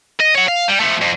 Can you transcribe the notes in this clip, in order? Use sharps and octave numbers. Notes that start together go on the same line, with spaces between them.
D#5
C#5 F#5
F5
G3
F3 A3
F2